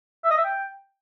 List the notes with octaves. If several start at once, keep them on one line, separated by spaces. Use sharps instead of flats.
E5
D#5
E5
G5